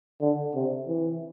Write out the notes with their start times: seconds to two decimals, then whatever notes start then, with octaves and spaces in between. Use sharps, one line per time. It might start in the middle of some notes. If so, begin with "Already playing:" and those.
0.21 D3
0.55 C3
0.88 E3